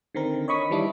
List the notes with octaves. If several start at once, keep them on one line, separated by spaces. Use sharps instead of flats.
D3 D#3 C4 A#4
C#5 D#5 B5 C#6 D#6 B6
D#3 E3 G3 D4 E4